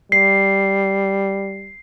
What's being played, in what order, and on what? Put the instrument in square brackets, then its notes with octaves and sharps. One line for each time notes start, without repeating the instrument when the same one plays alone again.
[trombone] G3 [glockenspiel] C7